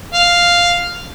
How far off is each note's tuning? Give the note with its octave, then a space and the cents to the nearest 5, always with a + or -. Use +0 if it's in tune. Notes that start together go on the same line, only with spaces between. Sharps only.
F5 +0